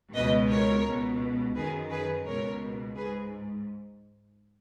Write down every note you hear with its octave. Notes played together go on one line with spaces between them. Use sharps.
C#2 B2 B4 D#5
A#4 C#5
C#2 B2
F#2 D#3 G#4 B4
G#4 B4
C#2 B2 A#4 C#5
G#2 G#4 B4